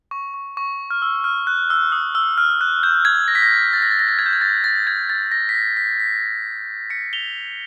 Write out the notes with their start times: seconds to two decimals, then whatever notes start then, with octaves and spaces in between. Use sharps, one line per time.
0.11 C#6
0.34 C#6
0.57 C#6
0.91 F6
1.02 E6
1.24 F6
1.47 F#6
1.70 E6
1.92 D#6
2.15 E6
2.38 F6
2.61 F#6
2.83 G6
3.05 G#6
3.28 A#6
3.35 B6
3.42 A#6
3.73 A6
3.82 A#6
3.91 A6
3.99 A#6
4.09 A6
4.19 G#6
4.26 G6
4.33 G#6
4.41 A6
4.64 A6
4.87 G#6
5.10 A6
5.32 A#6
5.49 B6
5.55 A#6
5.77 B6
6.00 B6
6.90 B6 C#7
7.13 F7 G7